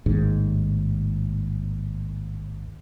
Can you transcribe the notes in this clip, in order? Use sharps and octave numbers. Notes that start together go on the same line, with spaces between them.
A1 D#2 G#2